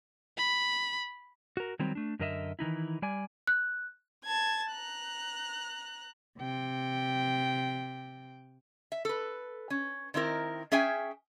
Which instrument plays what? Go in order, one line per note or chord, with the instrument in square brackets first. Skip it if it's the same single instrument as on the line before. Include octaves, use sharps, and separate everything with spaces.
[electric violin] B5
[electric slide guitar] F#4 A#4
D#3 F#3 G3 C4
A3 D4
F#2 D3 A#4 D#5 E5
D#3 E3 D#4 E4
G3 D5 G#5
[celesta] F#6
[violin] A5 G#6
A#5 F#6
[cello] C3 G5
[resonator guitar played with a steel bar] E5
A4 B4
C#4
D#3 C4 E4 A#4
C#4 G#4 E5 G5 G#5